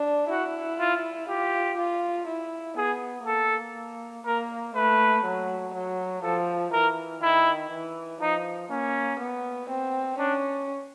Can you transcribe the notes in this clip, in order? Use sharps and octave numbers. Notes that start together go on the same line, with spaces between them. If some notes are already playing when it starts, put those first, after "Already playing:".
Already playing: D4
E4 F#4
F4
F4 G4
F4
E4
B3 G#4
A#3 A4
A#3 A#4
A3 B4
F#3
F#3
F3 A4
E3 A#4
D#3 E4
E3
F3 D#4
A#3 C#4
B3
C4
C#4 D4